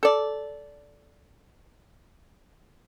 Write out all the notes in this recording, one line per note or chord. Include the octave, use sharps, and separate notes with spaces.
A4 D5